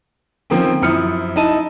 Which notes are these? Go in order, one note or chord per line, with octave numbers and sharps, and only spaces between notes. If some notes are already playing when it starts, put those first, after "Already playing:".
D#3 F3 A#3 C4 C#4
F#2 F3 E4 D#6 F6 C#7
D#4 E4 A5 D#7